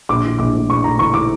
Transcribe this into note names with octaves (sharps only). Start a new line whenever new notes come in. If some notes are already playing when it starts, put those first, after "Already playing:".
A#1 D6
E3
A#1 D6
A2
A#1 C#6
A2 A#5
E3 C#6
E3 D6